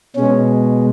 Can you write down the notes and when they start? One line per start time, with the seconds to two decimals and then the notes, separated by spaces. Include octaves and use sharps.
0.16 B2 G#3 C#4